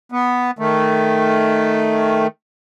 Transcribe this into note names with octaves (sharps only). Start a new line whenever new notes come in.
B3
D#3 A3